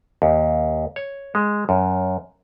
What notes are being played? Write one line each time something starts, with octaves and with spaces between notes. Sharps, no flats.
D#2
C#5
G#3
F#2